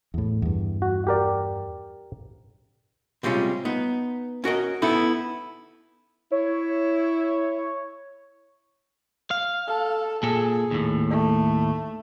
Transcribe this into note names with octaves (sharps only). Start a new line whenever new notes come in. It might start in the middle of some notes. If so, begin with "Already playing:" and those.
E2 A2
E2 G2
F#4
G4 A#4 D5
C3 G3 G#3 C#4 F4
B3 D#4
C#4 F#4 A#4 D#5
B3 C#4 D#4 E4 A4
E4 C#5
F5
A4
A#2 G#4 A4
D#2 A2
A3